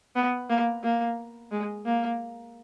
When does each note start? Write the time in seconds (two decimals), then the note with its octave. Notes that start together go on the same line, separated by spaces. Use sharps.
0.16 B3
0.49 A#3
0.83 A#3
1.52 G#3
1.86 A#3